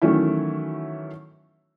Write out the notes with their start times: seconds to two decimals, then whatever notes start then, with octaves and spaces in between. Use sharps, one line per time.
0.02 D#3 E3 F#3 A3 C#4 E4